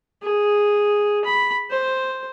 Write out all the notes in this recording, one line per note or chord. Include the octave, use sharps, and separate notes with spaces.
G#4
B5
C5